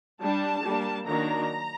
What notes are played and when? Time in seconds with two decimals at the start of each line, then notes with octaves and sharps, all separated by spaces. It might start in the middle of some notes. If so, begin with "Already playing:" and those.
0.21 G3 D4 A5
0.63 G3 A#3 D4
1.06 D#3 F#3 A#3 D4 A#5